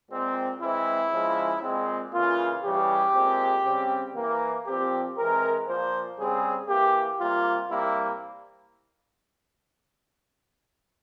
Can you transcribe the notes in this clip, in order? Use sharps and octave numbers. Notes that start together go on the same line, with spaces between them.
A#2 G#3 C4
E3 G#3 C4 E4
C#3 F3 G#3
A#2 G#3 C4
C#3 E3 A#3 F4
C#3 E3 G3 G4
A#2 G#3 C4
C#3 G3 C4
E3 A#3
A#2 F3 C4 G4
E3 G#3 C4 A#4
A#2 F3 A#3 C5
C#3 G3 C4 G#4
E3 A#3 G4
C3 G3 A#3 F4
C3 G3 A#3 E4